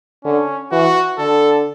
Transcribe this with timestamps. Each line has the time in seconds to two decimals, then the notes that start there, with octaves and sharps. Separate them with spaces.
0.24 D3 C#4
0.72 E3 F#4
1.18 D3 A4